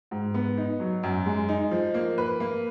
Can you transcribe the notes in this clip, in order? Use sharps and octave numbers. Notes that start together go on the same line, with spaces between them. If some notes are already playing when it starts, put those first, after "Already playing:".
G#2
B3
D#4
F#3
F#2
G#3
D#4
F3
A#3
B4
A#3